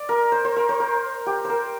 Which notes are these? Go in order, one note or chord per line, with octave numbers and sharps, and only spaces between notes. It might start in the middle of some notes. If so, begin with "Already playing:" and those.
Already playing: D5
A#4
C5
C5
A#4
C5
A#4
G4
A#4 C5